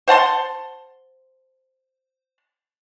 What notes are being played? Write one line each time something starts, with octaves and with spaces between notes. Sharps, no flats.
C5 F#5 A5 C6